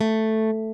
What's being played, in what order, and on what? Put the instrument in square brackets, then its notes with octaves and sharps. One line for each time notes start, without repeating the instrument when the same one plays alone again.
[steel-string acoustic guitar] A3